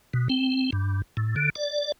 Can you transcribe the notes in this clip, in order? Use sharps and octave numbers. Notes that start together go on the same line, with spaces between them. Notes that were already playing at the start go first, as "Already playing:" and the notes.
B2
C4
G2
A2
D3
D5